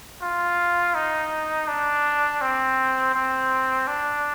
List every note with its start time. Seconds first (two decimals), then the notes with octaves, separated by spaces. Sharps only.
0.22 F4
0.95 D#4
1.68 D4
2.41 C4
3.14 C4
3.87 D4